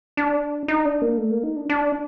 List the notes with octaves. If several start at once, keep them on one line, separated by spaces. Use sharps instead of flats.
D4
D#4
D4
A#3
A3
A#3
D#4
D4
D4